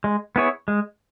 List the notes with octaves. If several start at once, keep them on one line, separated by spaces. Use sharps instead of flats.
G#3
B3 E4 G#4 C#5
G#3